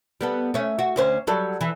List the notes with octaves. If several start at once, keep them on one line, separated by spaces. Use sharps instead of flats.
G3 B3 A4
A3 C#4
F#4
D2 C#4 C5
F#3 G3 A4
E3